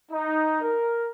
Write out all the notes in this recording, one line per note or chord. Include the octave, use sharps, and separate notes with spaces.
D#4
A#4